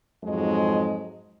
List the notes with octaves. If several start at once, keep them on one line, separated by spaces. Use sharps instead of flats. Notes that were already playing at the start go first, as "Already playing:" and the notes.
F2 G#2 F#3 G#3 D#5